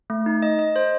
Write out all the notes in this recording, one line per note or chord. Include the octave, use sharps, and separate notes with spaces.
A3
D#4
D#5
D#5
C5